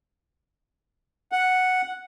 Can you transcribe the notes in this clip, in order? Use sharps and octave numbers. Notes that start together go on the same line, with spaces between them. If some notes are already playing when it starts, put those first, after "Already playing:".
F#5